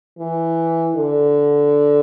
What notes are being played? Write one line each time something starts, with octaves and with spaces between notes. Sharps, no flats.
E3
D3